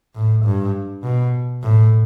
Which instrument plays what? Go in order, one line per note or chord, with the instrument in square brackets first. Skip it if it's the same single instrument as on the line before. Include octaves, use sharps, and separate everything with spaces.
[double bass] A2
G2
B2
A2